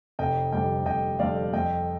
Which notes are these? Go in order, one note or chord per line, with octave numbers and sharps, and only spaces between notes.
F1 D#5 G5
F2 D3 G3 D#5 G5
F1 D#5 G5
F2 D3 G3 D5 F5
F2 D#5 G5